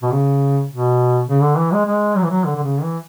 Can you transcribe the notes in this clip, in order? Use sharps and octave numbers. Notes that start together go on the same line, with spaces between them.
B2
C#3
B2
C#3
D3
E3
G#3
G#3
F#3
E3
F#3
D3
D3
C#3
E3